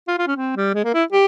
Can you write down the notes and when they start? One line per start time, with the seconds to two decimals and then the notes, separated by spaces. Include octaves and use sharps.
0.08 F4
0.18 F4
0.27 C#4
0.36 C4
0.56 G3
0.74 G#3
0.84 A#3
0.94 E4
1.12 G4